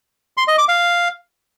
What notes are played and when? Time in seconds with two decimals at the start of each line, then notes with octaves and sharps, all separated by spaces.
0.37 C6
0.48 D#5
0.58 D6
0.68 F5